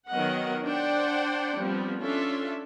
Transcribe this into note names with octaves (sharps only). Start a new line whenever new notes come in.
D#3 F#3 B3 A#4 D#5 F#5
D4 C5 D5 F#5 G5
F3 G3 B3 C4
C#4 D4 F4 A4 E5